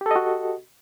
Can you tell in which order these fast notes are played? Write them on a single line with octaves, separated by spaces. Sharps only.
G4 A4 D#5 F#4